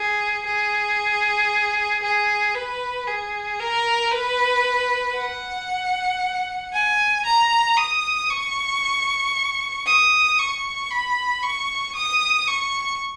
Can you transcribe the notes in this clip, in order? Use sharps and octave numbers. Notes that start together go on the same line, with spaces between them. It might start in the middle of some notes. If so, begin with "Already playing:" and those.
Already playing: G#4
G#4
G#4
B4
G#4
A#4
B4
F#5
G#5
A#5
D#6
C#6
D#6
C#6
B5
C#6
D#6
C#6